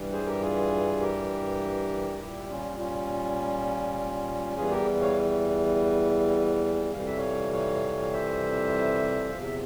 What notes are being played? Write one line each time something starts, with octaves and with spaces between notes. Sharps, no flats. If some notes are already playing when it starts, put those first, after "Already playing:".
Already playing: G2 E3 G3
G#4 C5
G4 A#4
F4 G#4
G4 A#4
A#2 G3 E4 G4
C#4 F4
C#4 F4
E2 E3 G3 F4 G#4
G4 A#4
C#5 F5
F2 C3 E3 G3 F5
E5
C#5 F5
C#5 F5
F5
C5 E5
E2 C3 F3 F5
E5